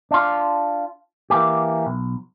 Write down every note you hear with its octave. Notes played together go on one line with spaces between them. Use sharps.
D4 F4
E3 A#3 G4
B1